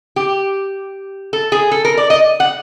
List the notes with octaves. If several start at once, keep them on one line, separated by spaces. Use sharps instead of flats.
G4
A4
G#4
A4
A#4
D5
D#5
F#5